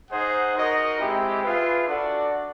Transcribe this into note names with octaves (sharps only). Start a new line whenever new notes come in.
D#4 G#4 C5 D#5 F#5
D#4 F#4 A#4 D#5
G#3 C4 E4 G4
F4 G#4 B4 E5
D4 F#4 A4 D5 F#5